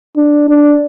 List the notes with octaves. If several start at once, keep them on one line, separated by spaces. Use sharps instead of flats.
D4
D4